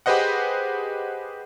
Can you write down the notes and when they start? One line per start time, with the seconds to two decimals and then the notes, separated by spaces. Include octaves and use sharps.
0.06 G4 G#4 B4 C5 D#5 F#5